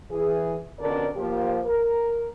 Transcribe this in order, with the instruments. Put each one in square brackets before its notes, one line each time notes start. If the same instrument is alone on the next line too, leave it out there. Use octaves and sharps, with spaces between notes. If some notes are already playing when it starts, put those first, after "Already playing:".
[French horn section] E3 G#4
F2 B2 D3 C#4 A#4 D5
F3 A#3 G4
A#4